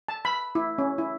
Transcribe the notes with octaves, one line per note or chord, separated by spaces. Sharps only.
A5
B5
E4
C#4
E4